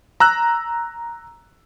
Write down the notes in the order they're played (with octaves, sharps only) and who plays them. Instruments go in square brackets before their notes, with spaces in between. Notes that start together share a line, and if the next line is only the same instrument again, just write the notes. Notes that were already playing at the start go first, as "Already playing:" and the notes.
[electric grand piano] A#5 E6 F#6